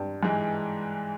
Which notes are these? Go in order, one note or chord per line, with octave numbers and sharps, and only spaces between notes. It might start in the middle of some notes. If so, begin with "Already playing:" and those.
Already playing: G2
G#2 E3 G#3